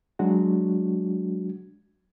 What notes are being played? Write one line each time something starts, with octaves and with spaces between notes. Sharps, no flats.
F#3 G#3 D4 F#4